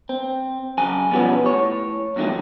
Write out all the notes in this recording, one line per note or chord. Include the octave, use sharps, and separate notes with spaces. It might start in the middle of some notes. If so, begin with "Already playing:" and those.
C4
C#3 F#3 G#5
B2 F3 G3 B3 C#4
A2 C#5
E2 G2 D#3 F#3 A3